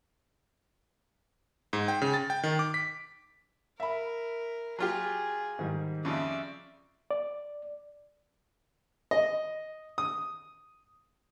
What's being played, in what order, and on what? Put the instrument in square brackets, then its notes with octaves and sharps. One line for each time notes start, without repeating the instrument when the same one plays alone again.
[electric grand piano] G#2
G5
C#3
A6
G5
D#3
D6
B6
[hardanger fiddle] A#4 [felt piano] E5 B5
[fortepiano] F#3 F4 G4 [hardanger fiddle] G#4
[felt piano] G#2 D#3 G3
[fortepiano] F2 C#3 [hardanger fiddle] D5 E5
[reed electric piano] D5
[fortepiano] D#5
D#6